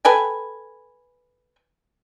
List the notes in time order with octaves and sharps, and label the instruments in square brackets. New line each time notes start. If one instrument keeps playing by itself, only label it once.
[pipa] A4 B4 G5 G#5